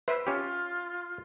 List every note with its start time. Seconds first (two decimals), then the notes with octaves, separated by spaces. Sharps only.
0.08 B4 C5 E5
0.27 C#4 F4 G4